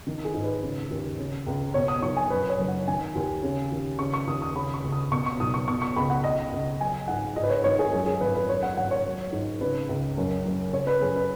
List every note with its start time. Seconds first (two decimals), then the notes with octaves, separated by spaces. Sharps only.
0.07 D#3
0.25 G#4
0.34 G#2
0.44 B4
0.63 C#3
0.90 D#2
1.18 C#3
1.47 C#2
1.74 B2 C#5
1.88 D#6
2.02 B1 C#6
2.17 G#5
2.30 F#2 B4
2.49 C#5
2.58 F#1
2.68 F#5
2.88 D#3 G#5
3.15 D#2
3.43 C#3
3.71 D#2
3.99 C#3 C#6
4.14 C#6
4.27 D#2 D#6
4.42 D#6
4.55 C#3 B5
4.74 C#6
4.83 C#2
4.92 D#6
5.11 B2 C#6
5.26 C#6
5.40 B1 D#6
5.54 C#6
5.68 B2 C#6
5.82 C#6
5.96 C#2 B5
6.10 F#5
6.24 C#3 D#5
6.52 C#2
6.80 F#3 G#5
7.08 G#2 F#5
7.36 G#2 D#5
7.43 B4
7.50 C#5
7.64 G#1 C#5
7.79 G#4
7.92 F#2 G#4
8.06 G#4
8.20 G#1 B4
8.35 B4
8.48 F#2 C#5
8.63 F#5
8.77 G#1 F#5
8.91 C#5
9.05 F#3
9.32 G#2
9.61 C#3 B4
9.89 C#2
10.18 F#2
10.46 F#1
10.73 C#3 C#5
10.87 B4
11.01 F#2 G#4
11.16 B4